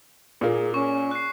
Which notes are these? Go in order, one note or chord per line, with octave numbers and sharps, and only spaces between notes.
A#2 A#3 G#4
C#4 C#6
F#6 C7